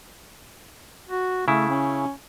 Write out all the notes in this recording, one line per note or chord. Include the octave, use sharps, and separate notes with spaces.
F#4
C#3 A3 E4
C#4